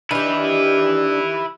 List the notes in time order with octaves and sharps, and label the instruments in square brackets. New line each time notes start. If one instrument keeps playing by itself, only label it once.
[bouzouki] D#3 G4 [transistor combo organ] D4 [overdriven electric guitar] E4 B4